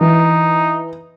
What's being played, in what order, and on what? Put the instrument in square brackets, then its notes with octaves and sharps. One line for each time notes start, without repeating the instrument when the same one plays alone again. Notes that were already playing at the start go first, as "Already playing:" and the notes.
[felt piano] E3 [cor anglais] D#4